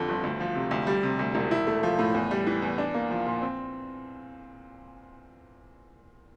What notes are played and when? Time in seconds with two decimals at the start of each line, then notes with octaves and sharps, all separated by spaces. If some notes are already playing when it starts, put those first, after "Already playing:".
Already playing: F2 D3
0.08 G1
0.24 D2
0.40 F3
0.55 C3
0.71 D2
0.87 G3
1.03 C3
1.19 D2
1.35 E1
1.51 E4
1.67 A3
1.83 F3
1.98 A2
2.14 E2
2.31 G3
2.47 E3
2.62 E2
2.78 D4
2.94 A#3
3.10 F3
3.26 A#2
3.42 C4